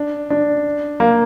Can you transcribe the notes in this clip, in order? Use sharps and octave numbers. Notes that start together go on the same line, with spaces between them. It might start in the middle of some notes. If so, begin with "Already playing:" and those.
Already playing: D4
D4
A#3